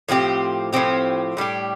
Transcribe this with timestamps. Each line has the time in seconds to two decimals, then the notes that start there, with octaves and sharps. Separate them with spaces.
0.08 A2 F3 C4 G4
0.73 A2 F3 C4 G4
1.37 A2 G3 D4 G4